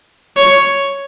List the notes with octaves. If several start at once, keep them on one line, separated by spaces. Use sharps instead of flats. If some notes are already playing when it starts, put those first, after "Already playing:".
C#5